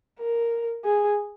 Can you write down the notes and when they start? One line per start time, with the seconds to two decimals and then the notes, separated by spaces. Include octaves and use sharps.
0.19 A#4
0.84 G#4